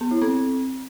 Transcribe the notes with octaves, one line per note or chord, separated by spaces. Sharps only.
B3
E4
C4